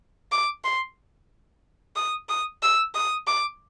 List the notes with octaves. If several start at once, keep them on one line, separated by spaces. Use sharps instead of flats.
D6
C6
D#6
D#6
E6
D#6
D6